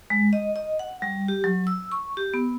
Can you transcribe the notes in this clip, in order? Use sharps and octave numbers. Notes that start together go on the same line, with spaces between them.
G#3
D#5
D#5
F#5
G3
G4
F#3
E6
C#6
G4
B3